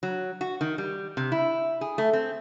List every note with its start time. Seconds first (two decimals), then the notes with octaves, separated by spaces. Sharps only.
0.03 F#3
0.41 F#4
0.61 D#3
0.78 G3
1.17 C3
1.32 E4
1.81 G#4
1.98 A3
2.13 C4